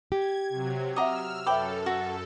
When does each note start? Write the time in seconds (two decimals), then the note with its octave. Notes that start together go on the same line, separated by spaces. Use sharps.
0.12 G4 G#6
0.49 C3 F#3
0.96 D#5 E5 F#5 A#5 D6 E6 F6
1.46 F#2 A4 B4 C#5 E5 G5 B5 D6
1.86 F#4